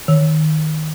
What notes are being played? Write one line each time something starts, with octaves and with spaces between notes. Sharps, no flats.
D#3